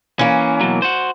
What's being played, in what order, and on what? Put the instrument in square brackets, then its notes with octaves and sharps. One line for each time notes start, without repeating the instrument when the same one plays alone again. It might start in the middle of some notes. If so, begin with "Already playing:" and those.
[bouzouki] E3 A#3 [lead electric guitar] C#4
[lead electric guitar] B2 F#3
F#4 C5